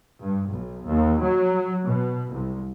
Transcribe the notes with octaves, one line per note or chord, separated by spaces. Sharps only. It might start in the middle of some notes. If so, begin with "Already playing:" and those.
G2
B1
D#2
F#3
B2
C2